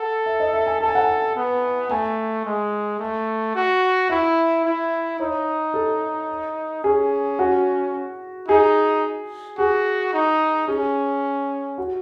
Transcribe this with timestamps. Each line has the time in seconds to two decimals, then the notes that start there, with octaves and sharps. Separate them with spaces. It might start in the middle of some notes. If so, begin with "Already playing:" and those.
Already playing: A4 F#5
0.26 E5
0.40 D#5
0.53 E5
0.66 G#5
0.81 A4 A5
0.88 G#5
0.95 F#5
1.03 G#5
1.36 B3
1.91 A3 G#5
2.46 G#3
3.00 A3
3.55 F#4
4.09 E4 E5
4.65 E4
5.19 D#4 C#5
5.74 A4
6.84 C#4 G#4
7.39 F#4
8.48 D#4 G#4
9.58 F#4 G#4
10.14 D#4
10.68 C#4 G#4
11.78 F#4